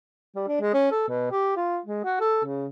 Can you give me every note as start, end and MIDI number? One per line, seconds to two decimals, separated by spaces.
0.36 0.43 55
0.48 0.58 62
0.61 0.72 56
0.74 0.89 61
0.91 1.05 69
1.09 1.30 47
1.31 1.54 67
1.56 1.79 65
1.86 2.04 56
2.05 2.19 66
2.20 2.40 69
2.45 2.67 49